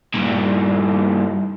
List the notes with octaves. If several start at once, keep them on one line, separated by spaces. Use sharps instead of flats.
G2 A#2